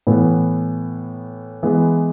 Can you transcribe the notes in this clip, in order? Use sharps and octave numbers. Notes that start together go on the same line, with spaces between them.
A2 E3 B3
E3 G#3 B3